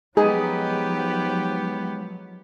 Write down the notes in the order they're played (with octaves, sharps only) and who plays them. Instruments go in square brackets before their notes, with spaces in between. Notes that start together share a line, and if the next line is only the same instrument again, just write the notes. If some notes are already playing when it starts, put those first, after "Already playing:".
[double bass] F3 F#3 [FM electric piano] G#3 D#4 [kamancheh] B3 G4 [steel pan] G#4